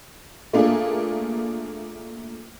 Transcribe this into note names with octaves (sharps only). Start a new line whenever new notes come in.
A3 A#3 D4 F4 G#4